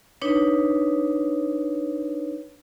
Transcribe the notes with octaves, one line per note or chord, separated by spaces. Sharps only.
D4 D#4 B4 C#5